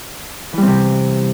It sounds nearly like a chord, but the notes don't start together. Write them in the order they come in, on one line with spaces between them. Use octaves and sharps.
E3 G3 C4 C3